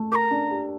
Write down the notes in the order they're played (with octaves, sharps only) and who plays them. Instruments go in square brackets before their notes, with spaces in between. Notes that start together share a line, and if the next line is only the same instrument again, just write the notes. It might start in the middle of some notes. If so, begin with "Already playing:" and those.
Already playing: [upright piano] A3
[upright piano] A#4 [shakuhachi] D6
[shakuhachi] A#5
[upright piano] D4
G4